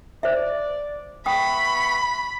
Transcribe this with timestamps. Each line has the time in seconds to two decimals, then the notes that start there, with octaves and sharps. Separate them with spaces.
0.23 C5 D5 E5
1.26 B3 E5 G5 B5 C#6 D#6